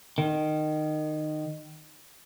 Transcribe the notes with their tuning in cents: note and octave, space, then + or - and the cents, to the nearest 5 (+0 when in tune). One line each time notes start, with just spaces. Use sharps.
D#3 -20